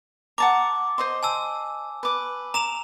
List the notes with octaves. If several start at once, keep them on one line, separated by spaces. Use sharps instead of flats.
F#5 A5 A#5 D6
C5 D#5 C6
G#5 A5 E6
B4 D6
A#5 D6 E7 F7